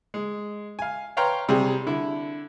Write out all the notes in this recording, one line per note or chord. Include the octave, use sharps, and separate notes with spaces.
G#3
F5 G#5
B4 C#5 F5 G5 A#5 C6
C3 G3 G#4
D3 E4